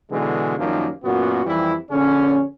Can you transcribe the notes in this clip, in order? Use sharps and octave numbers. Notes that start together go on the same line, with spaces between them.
B2 D3 E3 G#3
F#2 D#3 F3 G3 A#3
F#2 A#2 B3 F#4
F2 E3 G3 E4
A#1 D3 C#4